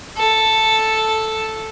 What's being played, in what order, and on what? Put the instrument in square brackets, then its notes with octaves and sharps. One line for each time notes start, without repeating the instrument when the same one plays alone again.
[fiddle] A4